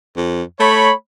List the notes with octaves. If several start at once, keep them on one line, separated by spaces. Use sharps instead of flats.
F2
A3 C#5 B5